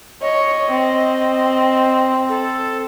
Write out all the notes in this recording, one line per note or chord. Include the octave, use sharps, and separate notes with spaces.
C#5 D#5
C4
A4